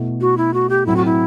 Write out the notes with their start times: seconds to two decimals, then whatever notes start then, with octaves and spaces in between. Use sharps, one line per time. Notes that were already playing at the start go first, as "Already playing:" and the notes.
Already playing: B2 A3 E4
0.21 F#4
0.37 E4
0.54 F#4
0.69 G4
0.86 A2 F#3 C4 E4
0.96 F#4
1.05 E4